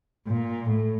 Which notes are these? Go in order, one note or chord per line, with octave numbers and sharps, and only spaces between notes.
A#2
A2